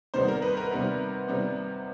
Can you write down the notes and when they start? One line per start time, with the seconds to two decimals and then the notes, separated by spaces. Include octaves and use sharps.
0.14 C3 D#3 G3 B3 C5
0.28 A#4
0.42 B4
0.57 A#4
0.71 C3 D#3 G3 B3
1.28 C3 D#3 G3 B3